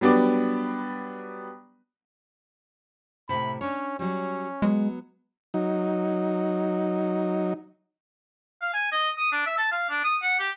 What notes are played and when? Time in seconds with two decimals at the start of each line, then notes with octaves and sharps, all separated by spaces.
0.01 F#3 G3 B3 D4 D6
3.29 A2 C3 B5
3.61 C#4 D4 C#5
3.99 F#3 G3 C#4
4.62 F#3 G#3 B3
5.54 F#3 D#4
8.62 F5
8.74 G#5
8.92 D#5
9.18 D#6
9.32 D4
9.46 E5
9.58 A5
9.72 F5
9.90 D4
10.04 D#6
10.22 F#5
10.39 G4